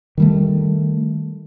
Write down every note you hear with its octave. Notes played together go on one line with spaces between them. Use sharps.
D#3 G3 A3